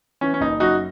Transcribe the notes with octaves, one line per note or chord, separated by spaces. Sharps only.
E3 C#4
C#4
F#1 D#4
F#2 D#4 F#4